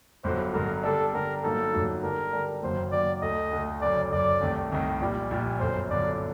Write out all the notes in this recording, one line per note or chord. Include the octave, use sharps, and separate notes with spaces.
G1 G2 D3 F#3 C5
G1 G2 D3 F#3 A#4
D3 G3 D4 A4
D3 G3 D4 A#4
G1 G2 F#3 A#3 D#4 A4
G1 G2 F#3 A#3 D#4
D3 G3 D4 A#4
D3 G3 D4
F#1 F#2 D#3 F#3 A#3 C5
F#1 F#2 D#3 F#3 A#3 D5
D2 D3 A3 D#5
D2 D3 A3
F#1 F#2 D3 D5
F#1 F#2 D3 D5
C2 C3 D#3 A3
C2 C3 D#3 A3 D#5
A#1 A#2 G3 D5
A#1 A#2 G3
G1 F#2 D3 C5
G1 F#2 D3 D5